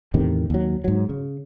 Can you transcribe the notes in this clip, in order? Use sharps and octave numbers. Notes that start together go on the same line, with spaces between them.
E2 A2 C3 D#3
D#2 F#3
G#2 F#3
C#3